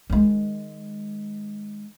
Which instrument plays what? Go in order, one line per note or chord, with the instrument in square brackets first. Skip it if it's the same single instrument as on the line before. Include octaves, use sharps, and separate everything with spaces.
[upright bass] D#3 G#3